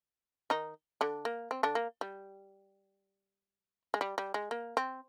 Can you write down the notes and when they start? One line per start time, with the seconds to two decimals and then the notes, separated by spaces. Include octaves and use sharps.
0.50 D#3 D#4
1.01 D3 D4
1.25 A#3
1.51 C4
1.63 D3 D4
1.75 A#3
2.01 G3
3.94 G#3
4.01 G3
4.18 G3
4.34 G#3
4.51 A#3
4.77 C4